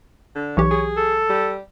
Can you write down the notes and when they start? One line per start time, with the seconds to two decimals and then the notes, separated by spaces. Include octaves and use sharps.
0.35 D3
0.57 B1 E3 G4 C#5
0.71 G#4
0.97 A4
1.29 G3